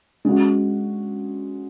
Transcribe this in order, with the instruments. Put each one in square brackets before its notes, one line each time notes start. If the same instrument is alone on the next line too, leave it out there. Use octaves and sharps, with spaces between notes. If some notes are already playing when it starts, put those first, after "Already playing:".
[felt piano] G#3 C#4 F#4